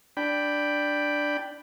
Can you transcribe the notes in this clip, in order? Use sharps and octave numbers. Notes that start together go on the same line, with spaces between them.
D4 G5 B5